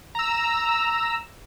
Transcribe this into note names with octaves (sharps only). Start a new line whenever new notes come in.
A#5 E6